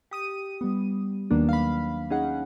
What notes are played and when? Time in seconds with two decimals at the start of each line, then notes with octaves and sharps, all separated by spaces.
0.11 G4 D#6 D#7
0.61 G3 B3
1.31 D#2 D#3 F#3 A#3 B3 D4
1.49 F5 B5
2.10 C#4 D#4 G#4 F#5